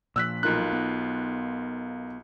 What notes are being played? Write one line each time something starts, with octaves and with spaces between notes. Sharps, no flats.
A#2 F3 E6 F#6 B6
B1 D#4 F4 A#4 F#6
B3